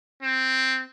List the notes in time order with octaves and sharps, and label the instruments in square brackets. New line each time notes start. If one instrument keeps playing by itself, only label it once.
[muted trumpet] C4